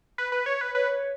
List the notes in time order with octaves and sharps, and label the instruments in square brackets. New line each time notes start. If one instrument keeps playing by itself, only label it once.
[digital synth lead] B4
B4
C#5
B4
[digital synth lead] B4 [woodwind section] C#5